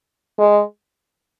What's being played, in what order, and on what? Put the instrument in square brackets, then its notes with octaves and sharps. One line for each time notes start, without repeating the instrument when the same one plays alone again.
[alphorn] G#3